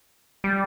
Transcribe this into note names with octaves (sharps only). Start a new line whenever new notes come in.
G3